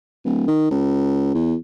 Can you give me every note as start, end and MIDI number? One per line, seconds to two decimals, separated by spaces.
0.25 0.45 26
0.47 0.71 51
0.71 1.32 37
1.34 1.55 40